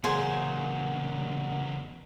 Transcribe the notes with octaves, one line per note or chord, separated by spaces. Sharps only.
E2 A#2 C#3 F#3 D#4 G#4 C5 G#5